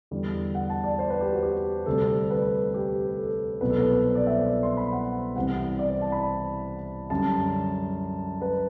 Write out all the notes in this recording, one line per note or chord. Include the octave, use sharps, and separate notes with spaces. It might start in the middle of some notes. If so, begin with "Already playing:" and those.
E2 D3 G3
F#5
A5
D5
C5
B4
G4
F#4
G4
D2 C3 G3 A4
B4
G4
A4
C2 B2 F#3 B4
A4
B4
C5
D5
E5
C5
D5
C6
B5
F#5
C2 C3 E3 G3 F#5
D5
C5
A5
B5
F#2 D3 G3 A5
B4